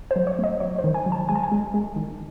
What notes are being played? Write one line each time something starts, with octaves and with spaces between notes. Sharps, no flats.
C5
F#3
C#5
A3 D#5
F#3 C#5
C5
D#3
G#5
F#3
A5
G#3 G#5
A5
G#5
G#3
G#3
D#3